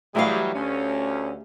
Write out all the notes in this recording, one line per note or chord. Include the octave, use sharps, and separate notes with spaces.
E3 F#3 G3 A3 E4 G4 G#4 F5
D2 C#4